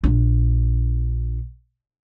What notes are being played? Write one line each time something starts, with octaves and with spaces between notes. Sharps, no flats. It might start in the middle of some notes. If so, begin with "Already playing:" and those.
A#1 D4